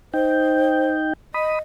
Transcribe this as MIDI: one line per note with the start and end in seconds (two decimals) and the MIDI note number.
0.14 1.13 63
0.14 0.91 72
0.14 1.13 79
1.34 1.57 75
1.34 1.59 83
1.34 1.59 87